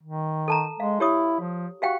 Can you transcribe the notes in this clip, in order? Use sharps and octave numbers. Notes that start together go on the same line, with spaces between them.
D#3
A4 A5 A#5
G#3 F5
E4 G4 C#5 D#6
F3
F#4 G4 F5 G5